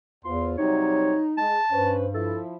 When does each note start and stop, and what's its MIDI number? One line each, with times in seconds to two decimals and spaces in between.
0.25 0.57 40
0.25 0.53 59
0.25 0.53 65
0.25 0.53 72
0.25 0.47 84
0.58 1.15 48
0.58 1.15 54
0.58 1.15 55
0.58 1.40 63
0.58 1.24 73
1.38 1.58 56
1.38 1.94 81
1.71 2.40 43
1.71 2.05 61
1.71 2.05 71
1.71 2.05 72
2.14 2.54 53
2.14 2.54 64
2.14 2.40 69